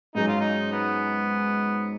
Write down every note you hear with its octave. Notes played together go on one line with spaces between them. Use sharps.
G#2 F#3 C#4 D#4 G#4
F4
D#4
B3